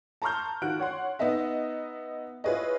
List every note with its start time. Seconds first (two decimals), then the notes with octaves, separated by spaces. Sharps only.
0.22 A5 A#5 C6 C#6 F6 G6
0.62 D#3 F4 F#4 F#6 D7
0.80 C#5 F#5 C6
1.19 B3 D#4 D#5 E5
2.44 E4 F4 G#4 B4 C#5 D#5